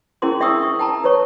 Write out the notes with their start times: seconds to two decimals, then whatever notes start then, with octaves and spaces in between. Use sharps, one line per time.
0.22 C#4 E4 G#4 A#4 C6 D6
0.40 D4 E5 G5 C#6 D#6 E6
0.63 C#6
0.79 G5 A5 A#5
1.04 A4 B4 C#5 C#6